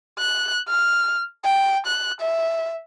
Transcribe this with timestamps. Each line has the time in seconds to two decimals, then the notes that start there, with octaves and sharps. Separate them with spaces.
0.19 F#6
0.68 F6
1.44 G5
1.86 F#6
2.21 E5